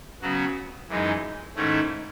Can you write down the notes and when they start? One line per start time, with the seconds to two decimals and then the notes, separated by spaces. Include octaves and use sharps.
0.22 C#3 F#3 B3 F#4
0.89 F#2 E3 G#3 D#4
1.56 G#2 D#3 A3 C#4 E4